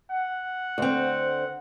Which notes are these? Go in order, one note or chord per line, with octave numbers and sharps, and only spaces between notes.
F#5
D2 C4